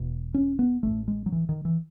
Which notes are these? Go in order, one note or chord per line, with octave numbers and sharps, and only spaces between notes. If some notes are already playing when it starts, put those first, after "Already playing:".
Already playing: E1 E2 B2
C#4
B3
A1 A2 A3
G#3
F#3
E3
D#3
E3